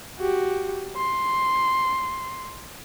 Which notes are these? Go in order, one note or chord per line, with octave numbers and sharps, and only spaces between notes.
F#4 G4
C6